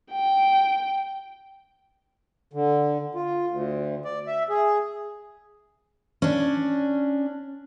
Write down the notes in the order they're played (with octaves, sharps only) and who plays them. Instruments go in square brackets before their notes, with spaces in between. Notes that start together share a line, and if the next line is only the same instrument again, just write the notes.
[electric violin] G5
[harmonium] D3
F4
D2
D5
E5
G#4
[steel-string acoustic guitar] C#4 D4